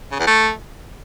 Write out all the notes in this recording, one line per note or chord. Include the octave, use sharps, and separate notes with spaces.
C#3
E2
A3